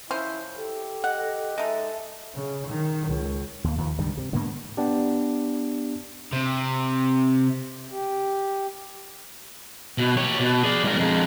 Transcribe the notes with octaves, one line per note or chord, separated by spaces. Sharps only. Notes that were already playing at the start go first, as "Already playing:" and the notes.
F3 C#4 E4 C5
G4 A4
D#5 F#5
G#3 D#4 A4 E5
C#3
D#3
C#2
D#2 A#3
D#2 D#3 F3
C#2 G2 D#3 G3
C3
G#2 D3 A#3 B3
B3 D4 G4
C3
G4
B2
G4 C#5
B2
G#4 D5
G#2 A#4
F2 G#3